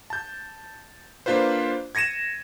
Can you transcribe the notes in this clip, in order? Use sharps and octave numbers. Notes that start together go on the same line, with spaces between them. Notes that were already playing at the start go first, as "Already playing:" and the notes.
A5 G6
A#3 D4 F4 B4 C5
G#6 A#6 C#7 D#7 E7